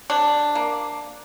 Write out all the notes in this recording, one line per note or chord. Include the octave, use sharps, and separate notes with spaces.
C3 D4
A#3